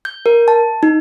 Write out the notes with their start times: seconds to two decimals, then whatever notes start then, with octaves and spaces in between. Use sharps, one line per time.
0.05 G6
0.26 A#4
0.48 A5
0.83 D#4